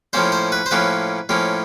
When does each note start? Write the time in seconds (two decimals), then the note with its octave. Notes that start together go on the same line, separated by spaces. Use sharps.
0.13 A2 F3 A#3 C#4 C5
0.32 C5
0.52 B4
0.66 C5
0.71 A2 F3 A#3 C#4 B4
1.29 A2 F3 A#3 C#4